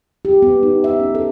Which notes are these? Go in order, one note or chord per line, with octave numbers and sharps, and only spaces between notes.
G4
B3
D#4
E5
C#4
A4